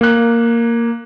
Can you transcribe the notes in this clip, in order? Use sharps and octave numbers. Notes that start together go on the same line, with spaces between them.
A#3 F#6